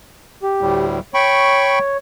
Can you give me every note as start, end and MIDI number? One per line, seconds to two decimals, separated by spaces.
0.43 0.86 67
0.61 1.00 38
0.61 1.00 45
0.61 1.00 55
1.14 1.97 73
1.14 1.79 79
1.14 1.79 83
1.14 1.79 85